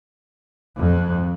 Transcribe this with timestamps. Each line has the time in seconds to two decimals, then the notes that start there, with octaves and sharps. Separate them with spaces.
0.78 F2